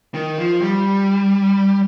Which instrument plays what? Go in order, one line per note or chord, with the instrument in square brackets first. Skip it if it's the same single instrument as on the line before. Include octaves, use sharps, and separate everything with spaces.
[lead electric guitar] D#3
F3
G3